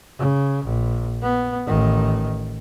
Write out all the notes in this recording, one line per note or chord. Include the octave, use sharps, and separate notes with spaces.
C#3
A#1
B3
A1 D#3